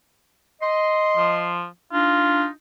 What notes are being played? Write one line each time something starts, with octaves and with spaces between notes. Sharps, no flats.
D#5 C6
F3
D4 D#4 F4